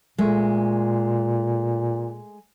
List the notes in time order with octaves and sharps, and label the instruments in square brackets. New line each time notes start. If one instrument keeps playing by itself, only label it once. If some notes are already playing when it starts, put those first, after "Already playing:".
[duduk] A#2 [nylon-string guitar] G#3 A3